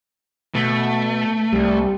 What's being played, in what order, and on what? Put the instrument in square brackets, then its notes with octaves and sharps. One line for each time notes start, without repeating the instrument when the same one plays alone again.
[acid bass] B2 [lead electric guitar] A3
[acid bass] C2 [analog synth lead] G3